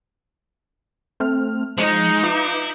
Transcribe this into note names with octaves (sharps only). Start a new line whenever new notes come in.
A3 C4 F6
F3 G#3 D#4 D#5 C#7
E4 F4 B4 D6